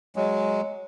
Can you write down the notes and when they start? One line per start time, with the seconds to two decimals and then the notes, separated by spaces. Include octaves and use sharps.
0.16 F#3 G#3